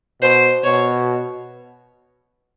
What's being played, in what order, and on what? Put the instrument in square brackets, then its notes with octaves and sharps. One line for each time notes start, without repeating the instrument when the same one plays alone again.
[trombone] B2 [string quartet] C5
[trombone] B2 [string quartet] C#5